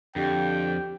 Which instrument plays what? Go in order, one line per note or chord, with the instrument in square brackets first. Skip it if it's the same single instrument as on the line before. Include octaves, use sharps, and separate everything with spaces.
[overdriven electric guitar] F2 [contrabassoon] D3 [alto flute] G4 [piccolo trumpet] G5